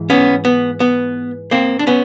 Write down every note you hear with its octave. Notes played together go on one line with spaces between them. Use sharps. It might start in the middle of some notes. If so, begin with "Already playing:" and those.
Already playing: G#2 E3
B3 C#4
B3
B3
A#3 C4
D4
B3 C#4